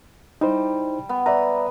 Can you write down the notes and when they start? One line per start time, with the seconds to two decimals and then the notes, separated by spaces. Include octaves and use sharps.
0.41 G3 D#4 E4 C5
1.09 B3
1.26 B4 D5 E5 A#5